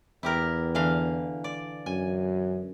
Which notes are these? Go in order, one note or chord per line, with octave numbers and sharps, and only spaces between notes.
E2 E4 G4 A#4
D3 E3 F5
D5
F#2 G#5